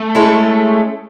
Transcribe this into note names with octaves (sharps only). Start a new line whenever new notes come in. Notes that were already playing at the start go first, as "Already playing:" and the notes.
Already playing: A3
G#3 C#4 E4 A4